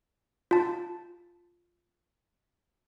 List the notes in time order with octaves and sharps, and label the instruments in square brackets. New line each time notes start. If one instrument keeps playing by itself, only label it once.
[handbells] F4 A5